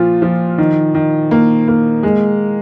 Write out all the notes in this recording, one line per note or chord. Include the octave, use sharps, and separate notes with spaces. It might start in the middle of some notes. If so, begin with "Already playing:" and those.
Already playing: A#2 F3 F4
F3
D#3
D#3
A#3
A#3
G#3